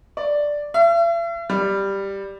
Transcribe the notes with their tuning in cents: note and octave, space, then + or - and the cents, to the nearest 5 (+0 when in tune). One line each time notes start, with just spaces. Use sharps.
D5 +0
E5 +45
G3 +5